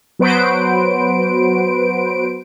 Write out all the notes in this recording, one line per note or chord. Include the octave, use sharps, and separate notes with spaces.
F#3 B3 F#4 B4 C5 D7